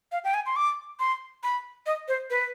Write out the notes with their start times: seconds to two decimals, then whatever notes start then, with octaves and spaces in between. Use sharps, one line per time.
0.12 F5
0.24 G5
0.34 G#5
0.46 C6
0.56 D6
1.00 C6
1.43 B5
1.86 D#5
2.08 C5
2.30 B4